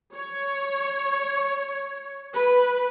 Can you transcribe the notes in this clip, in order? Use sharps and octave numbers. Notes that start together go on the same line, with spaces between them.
C#5
B4